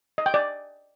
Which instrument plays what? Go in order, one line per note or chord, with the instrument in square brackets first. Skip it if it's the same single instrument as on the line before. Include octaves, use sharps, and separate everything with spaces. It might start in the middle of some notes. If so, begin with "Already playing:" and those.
[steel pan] D#5
G5
D5